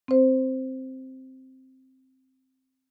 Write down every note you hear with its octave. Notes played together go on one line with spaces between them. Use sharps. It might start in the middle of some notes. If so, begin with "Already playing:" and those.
C4 C5